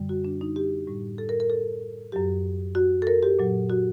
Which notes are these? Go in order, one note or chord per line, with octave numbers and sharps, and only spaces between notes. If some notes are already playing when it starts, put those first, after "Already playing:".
Already playing: F#2 D3 G3
F#4
D4
D#4
G4
A2 G3
A4
A#4
A#4
A4
F#2 F#3 G4
F#4
A4
A#4
G4
A#2 F#3
F#4